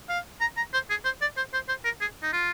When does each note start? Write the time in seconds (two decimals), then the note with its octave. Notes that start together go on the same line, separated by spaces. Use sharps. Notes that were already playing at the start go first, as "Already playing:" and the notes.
0.09 F5
0.41 A#5
0.57 A#5
0.73 C5
0.90 G#4
1.05 C5
1.21 D5
1.37 C5
1.53 C5
1.68 C5
1.84 A#4
2.01 G#4
2.23 D#4
2.33 F4